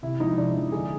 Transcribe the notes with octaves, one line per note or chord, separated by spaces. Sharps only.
C3 E4
F3 G#3 D#4
C3 D4
F3 G#3
D3 G#4